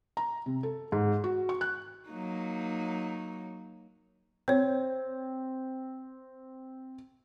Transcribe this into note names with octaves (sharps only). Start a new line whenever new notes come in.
A#5
C3
A4
G#2
F#4
C#6
F#6
F#3 A#3 D#4
C4 C5 C#5